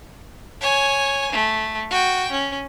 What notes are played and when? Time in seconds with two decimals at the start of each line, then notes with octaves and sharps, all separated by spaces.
0.61 C#5 G#5
1.32 A3
1.90 F#4 G5
2.31 C#4